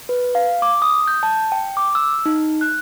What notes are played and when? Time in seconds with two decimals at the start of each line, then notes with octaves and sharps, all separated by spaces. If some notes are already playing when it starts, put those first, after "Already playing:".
0.09 B4
0.35 F5
0.62 D6
0.82 D#6
1.08 G6
1.23 A5
1.52 G5
1.77 D6
1.95 E6
2.26 D#4
2.61 F#6